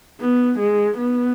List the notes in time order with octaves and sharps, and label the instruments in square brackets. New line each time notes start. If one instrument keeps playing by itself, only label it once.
[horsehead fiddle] B3
G#3
B3